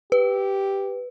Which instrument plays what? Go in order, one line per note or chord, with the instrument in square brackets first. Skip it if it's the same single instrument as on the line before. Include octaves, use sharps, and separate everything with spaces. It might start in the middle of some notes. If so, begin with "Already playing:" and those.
[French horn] G4 [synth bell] B4